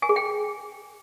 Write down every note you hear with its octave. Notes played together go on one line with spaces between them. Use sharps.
G#5
G#4
G5